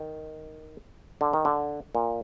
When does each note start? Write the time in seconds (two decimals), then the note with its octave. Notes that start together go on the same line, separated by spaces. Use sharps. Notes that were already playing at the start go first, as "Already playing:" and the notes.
Already playing: D#3
1.21 D3
1.33 D#3
1.45 D3
1.95 A#2